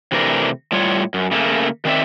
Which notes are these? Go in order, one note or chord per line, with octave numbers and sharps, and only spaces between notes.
C3 E3 A3 D4 A#4
A2 G3 F4 C#5
F#2
C#3 A3 A#3
D#3 C4 B4 D5 E5